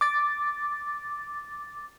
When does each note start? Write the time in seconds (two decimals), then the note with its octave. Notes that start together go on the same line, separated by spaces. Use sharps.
0.01 D6 A6